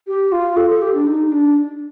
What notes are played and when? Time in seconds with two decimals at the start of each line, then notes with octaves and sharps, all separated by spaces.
0.07 G4
0.32 F4
0.57 A4
0.70 A4
0.82 G4
0.94 D4
1.07 D#4
1.32 D4